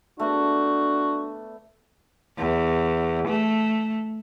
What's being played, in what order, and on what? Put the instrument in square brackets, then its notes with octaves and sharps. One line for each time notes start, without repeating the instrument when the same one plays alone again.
[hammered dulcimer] A3 B3 D5 [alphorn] D4 [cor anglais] F#4
[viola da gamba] E2
A3